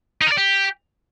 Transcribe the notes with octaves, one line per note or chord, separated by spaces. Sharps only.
D#4
A#4
D5
G4